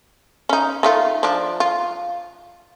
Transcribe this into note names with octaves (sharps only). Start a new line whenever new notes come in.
C#4 D#4
D#3 A3 F4
F3 D4
F4